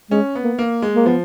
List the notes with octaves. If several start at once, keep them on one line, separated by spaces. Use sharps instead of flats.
G#3 C#4
B3
A#3
A#3
G#3
A#3
F3 B3